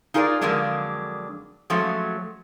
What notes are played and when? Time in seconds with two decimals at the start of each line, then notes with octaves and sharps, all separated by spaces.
0.14 D#4 F4 G#4 A#4 C#5 D5
0.41 F2 D3 F#3 G#3 A#3 D4
1.70 F3 F#3 G#3 A3 C#4